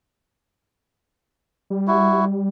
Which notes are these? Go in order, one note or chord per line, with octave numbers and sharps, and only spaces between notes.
G3
E4 F#4